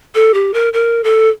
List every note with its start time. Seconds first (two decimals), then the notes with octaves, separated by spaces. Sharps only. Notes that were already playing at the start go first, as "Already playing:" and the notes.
0.15 A4
0.34 G4
0.54 A#4
0.73 A#4
1.04 A4